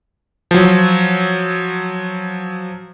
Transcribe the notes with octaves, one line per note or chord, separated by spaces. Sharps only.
F3 F#3